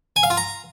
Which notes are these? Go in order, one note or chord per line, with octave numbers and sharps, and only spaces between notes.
G#5
F5
F4
A#5